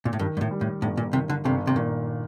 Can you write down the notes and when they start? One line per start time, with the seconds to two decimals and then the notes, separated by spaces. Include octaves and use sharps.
0.05 A#2
0.13 A2
0.19 G2 D#3
0.37 G2
0.41 A2
0.51 G3
0.61 A2
0.82 G1 A2
0.97 A#2
1.13 C3 D#3
1.30 D3
1.45 G1 C3
1.67 C3
1.76 A#2 D#3